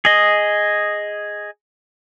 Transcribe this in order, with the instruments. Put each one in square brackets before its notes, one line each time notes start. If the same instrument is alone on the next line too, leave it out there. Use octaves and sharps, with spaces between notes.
[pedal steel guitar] G#4 D#5